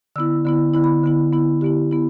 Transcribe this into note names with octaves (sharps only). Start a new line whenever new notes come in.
D3 B3 E4 E6
D3 B3 E4
D3 B3 E4
B5
D3 B3 E4
D3 B3 E4
D3 B3 E4 G4
B3 E4